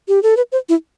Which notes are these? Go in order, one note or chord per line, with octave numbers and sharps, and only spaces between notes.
G4
A4
B4
C5
E4